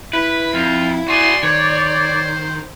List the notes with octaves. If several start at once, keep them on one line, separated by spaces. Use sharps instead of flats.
E4 B4 B5
F2 F4
F#4 G#4 D5 C6
D#3 C5 C#5